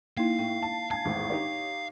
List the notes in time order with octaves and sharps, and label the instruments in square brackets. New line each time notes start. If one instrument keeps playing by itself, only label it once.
[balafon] A#3 D#4 E4 [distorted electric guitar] F5
[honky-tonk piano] A2 [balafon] G5
[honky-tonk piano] A5
[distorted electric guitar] F5 [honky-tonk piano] G#5 A5 G#6
[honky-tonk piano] G#1 E2 A2
D#4 G4 C#5